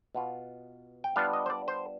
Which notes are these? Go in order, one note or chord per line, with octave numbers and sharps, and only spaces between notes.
B2 B3 F4
G5
G3 B3 D4 F4 F5
D#5
C5
D5
C5